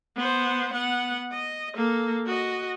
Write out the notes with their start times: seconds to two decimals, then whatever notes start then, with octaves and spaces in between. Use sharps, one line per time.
0.16 B3 C5
0.73 B3 F#5
1.32 D#5
1.76 A#3 A4
2.27 F#4 D#5